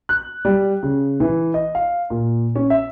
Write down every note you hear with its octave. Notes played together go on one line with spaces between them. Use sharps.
F#6
G3
C#3
E3
D#5
F5
A#2
C#4
E5